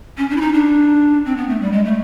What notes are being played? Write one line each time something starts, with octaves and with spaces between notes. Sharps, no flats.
C#4
D4
E4
D#4
D4
C4
B3
A3
G3
G#3
A3